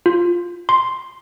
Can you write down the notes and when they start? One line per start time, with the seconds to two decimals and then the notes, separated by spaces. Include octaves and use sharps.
0.06 F4
0.69 C6